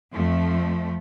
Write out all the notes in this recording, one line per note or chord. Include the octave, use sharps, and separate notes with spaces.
F2 F3 A3